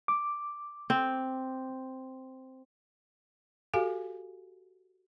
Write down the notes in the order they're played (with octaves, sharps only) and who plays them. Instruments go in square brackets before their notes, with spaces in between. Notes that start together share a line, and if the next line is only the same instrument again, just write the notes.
[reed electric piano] D6
[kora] C4
[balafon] F#4 G4 A4 F5 G#5